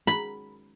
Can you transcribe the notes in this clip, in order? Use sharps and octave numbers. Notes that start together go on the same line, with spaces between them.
B5